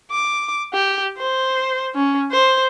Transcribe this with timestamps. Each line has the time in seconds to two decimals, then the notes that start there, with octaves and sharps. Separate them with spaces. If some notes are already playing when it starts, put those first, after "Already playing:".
0.11 D6
0.74 G4
1.18 C5
1.95 C#4
2.31 C5